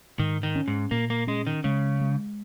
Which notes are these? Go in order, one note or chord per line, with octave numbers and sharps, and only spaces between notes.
G#2 D#3
D#3
C#4
G#2
A#2 A#3
A#3
G#3 C#4
D#3
C#3 G#3
G#3